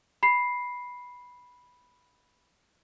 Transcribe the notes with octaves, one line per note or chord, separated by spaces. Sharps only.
B5 C7